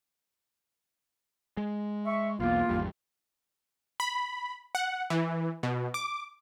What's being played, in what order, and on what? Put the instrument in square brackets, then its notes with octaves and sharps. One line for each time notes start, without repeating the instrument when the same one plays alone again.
[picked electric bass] G#3
[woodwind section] E5 C#6
[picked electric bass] B1 E2 [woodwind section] A#3 F4
[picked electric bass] G#1 E2 G3
[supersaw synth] B5
F#5
E3
B2
D6